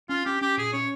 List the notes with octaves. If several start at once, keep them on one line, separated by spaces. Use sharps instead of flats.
C#4 F4
C#4 G4
C#4 G4
A#2 G#4
C#4 C#5